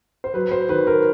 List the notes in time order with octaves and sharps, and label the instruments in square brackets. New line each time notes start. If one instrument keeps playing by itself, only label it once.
[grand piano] C5
F#3 B4
C5
D#3 B4
A#4